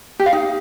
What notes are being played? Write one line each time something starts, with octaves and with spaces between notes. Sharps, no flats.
G4
F5
D#4